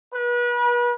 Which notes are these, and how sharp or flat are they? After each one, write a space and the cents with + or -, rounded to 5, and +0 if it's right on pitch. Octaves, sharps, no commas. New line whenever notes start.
B4 -35